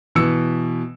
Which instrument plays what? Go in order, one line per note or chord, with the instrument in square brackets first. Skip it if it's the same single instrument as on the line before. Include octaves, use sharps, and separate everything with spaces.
[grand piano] B2 E3 E6 C#7